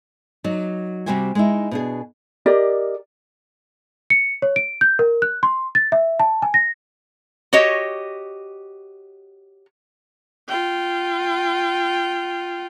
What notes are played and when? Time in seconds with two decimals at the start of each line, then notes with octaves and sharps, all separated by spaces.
0.44 F#3 D#4 D5
1.06 C3 G3 F#4 G4 C5 G#5
1.35 G#3 D#4 E4
1.71 B2 D4 G#4
2.46 G4 A#4 D5 D#5
4.10 C#7
4.42 C#5
4.56 D7
4.81 G6
4.99 A#4
5.22 F#6
5.43 C6
5.75 A6
5.92 E5
6.20 A5
6.42 G#5
6.54 A#6
7.53 F#4 G4 C#5 D#5
10.48 F4 G5